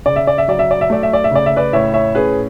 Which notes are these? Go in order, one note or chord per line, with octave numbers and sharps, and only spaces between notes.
C#3 D5
E5
D5
E5
F#3 D5
E5
D5
E5
A3 D5
E5
D5
E5
C#3 D5
E5
B4 D5
A2 C#5 E5
C#5 E5
C#4 G#4 B4